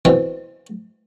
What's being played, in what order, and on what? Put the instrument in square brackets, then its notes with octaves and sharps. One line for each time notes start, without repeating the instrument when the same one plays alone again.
[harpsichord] B2 E3 C4